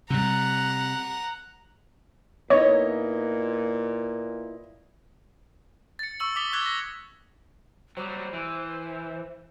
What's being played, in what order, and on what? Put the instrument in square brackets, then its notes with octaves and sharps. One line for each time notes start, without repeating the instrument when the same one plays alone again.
[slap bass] C3 G3 [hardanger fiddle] F#5 A#5
[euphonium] A#2 [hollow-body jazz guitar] B3 D#4 E4 [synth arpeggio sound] C#5 [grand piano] D#5
[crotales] A6 C#7
C#6 E6 F#7
D6 D#6 B6 G7
D6 F#6 G#6 B6 G7
A#6
[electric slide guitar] F#3 G3 [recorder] C5
[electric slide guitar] E3